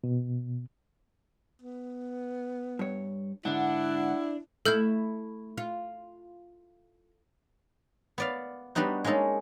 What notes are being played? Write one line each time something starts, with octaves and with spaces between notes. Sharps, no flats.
B2
B3
G2 C#5
G#2 D3 D4 E4 F#5
A3 E4 A4 F6 G6
F4
B3 D5 F5
G3 B3 D4 D#4 F#4
G#3 A#3 C#4 D#4 A4